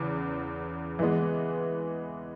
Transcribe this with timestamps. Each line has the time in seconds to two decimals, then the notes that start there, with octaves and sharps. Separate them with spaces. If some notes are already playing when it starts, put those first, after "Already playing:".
Already playing: E2 C#3
0.99 E3 G#3 B3